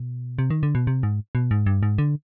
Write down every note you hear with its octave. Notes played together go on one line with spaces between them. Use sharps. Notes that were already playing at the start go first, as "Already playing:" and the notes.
Already playing: B2
C3
D#3
D3
B2
C3
G#2
B2
G#2
G2
G#2
D3